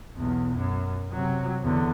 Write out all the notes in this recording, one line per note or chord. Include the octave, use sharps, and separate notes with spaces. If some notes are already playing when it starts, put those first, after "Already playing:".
B1 E2
F#2
C3 F#3
E2 D3